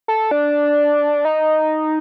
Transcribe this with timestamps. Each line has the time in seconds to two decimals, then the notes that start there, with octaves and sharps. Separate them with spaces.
0.08 A4
0.31 D4
1.25 D#4